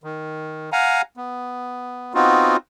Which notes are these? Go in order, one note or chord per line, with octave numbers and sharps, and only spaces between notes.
D#3
F5 F#5 G#5 A#5
B3
B3 C4 D#4 F4 F#4